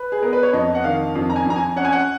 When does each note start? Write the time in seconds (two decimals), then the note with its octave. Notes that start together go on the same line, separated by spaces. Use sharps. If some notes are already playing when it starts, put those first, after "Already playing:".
Already playing: B4
0.12 G#4
0.22 B3 A#4
0.33 B4
0.43 C#5
0.53 F2 D#5
0.75 F#5
0.84 D#3 F5
1.15 F2
1.30 A#5
1.36 G#5
1.45 F2 A#5
1.56 G#5
1.76 C#4 F#5
1.85 G#5
1.92 F#5